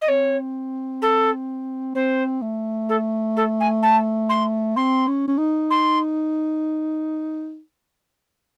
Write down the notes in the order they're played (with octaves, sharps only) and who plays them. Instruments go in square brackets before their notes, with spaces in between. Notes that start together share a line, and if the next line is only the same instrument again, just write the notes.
[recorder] D#5
[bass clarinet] C4 [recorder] C#5
[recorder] A4
[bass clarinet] C4 [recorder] C5
[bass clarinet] A3
[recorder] A4
A4
G#5
A5
C6
[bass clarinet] C4 [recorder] C6
[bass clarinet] C#4
C#4
D#4
[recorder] C6